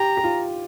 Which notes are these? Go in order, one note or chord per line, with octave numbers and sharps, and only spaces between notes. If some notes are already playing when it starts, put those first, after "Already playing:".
Already playing: G4 A#5
G4
F4